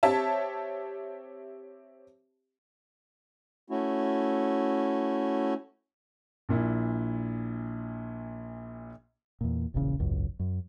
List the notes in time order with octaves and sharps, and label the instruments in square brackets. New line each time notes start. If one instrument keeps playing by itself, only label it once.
[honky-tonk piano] C4 G4 C#5 E5 A5
[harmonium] A3 C#4 E4 F#4
[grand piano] A#1 A#2 E4
[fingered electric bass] E2 A#2
E1 A#1 E2 C#3
G#1 C#2 F#2
F#2